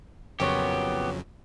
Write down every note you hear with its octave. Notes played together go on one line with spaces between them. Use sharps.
F2 A#2 C#3 F#3 B3 G4 C#5